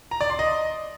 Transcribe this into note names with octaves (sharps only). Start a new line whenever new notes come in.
A#5
D5
C6
D#5